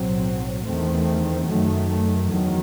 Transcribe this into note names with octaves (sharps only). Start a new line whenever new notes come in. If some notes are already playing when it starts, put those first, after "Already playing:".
Already playing: B1 A2 F#3 C4
E2 D#3 A3 C4
F#2 D#3 F#3 A3
E2 D#3 F#3